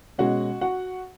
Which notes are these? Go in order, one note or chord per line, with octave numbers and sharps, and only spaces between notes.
B2 G#3 C#4 F#4 F#5
F#4 F#5